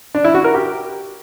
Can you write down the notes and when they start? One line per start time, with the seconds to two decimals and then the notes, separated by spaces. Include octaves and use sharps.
0.15 D4
0.24 E4
0.34 F#4
0.44 A#4
0.54 G4